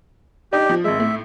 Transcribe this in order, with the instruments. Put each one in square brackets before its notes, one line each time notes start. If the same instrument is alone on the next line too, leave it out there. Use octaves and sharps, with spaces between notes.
[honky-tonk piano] D4 D#4 [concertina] G4
[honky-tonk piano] F3
[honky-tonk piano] G#1 G#3 [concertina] E5
[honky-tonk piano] A2